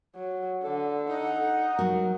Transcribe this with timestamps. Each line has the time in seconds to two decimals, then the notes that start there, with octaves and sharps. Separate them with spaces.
0.16 F#3
0.64 D3 A4
1.10 D#4 F#5
1.79 F#3 F#4 A#4